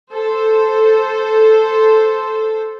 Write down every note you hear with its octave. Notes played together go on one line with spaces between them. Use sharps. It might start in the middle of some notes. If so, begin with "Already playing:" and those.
A4 C5